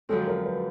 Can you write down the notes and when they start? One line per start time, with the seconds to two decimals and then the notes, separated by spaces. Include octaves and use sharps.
0.09 F#2 D3 F3 G#3 C4 A4
0.27 A#4
0.46 B4